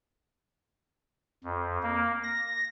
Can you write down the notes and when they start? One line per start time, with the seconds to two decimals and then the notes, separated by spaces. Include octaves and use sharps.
1.44 F2
1.83 A#3
2.24 A#6